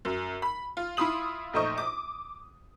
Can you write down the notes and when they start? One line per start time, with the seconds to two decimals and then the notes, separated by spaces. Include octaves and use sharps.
0.05 F#2
0.42 B5
0.77 F4
0.97 E4 F4 B5 C6 D#6 F#7
1.53 A#1 A3 D#4 C5 C#6 D#6
1.78 D6